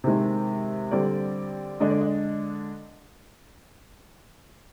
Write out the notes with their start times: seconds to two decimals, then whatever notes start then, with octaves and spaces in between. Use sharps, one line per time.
0.04 C3 D#3 G#3 C5
0.91 D3 G3 C4 D5
1.80 D3 G#3 D4 D#5
1.90 D5
2.01 D#5